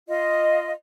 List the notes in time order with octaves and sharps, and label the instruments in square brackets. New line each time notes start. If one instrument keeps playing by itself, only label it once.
[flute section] F4 D#5